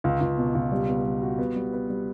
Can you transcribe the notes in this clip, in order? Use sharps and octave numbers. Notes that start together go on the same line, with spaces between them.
C#2
C#2
B2
C#2
G3
B3
G3
F#4
B3
G3
B3
G3